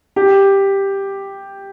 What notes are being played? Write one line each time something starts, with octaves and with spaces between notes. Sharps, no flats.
G4